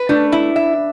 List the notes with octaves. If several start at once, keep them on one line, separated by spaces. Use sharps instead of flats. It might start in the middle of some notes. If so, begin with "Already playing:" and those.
Already playing: B4
A3 D4
E4
E5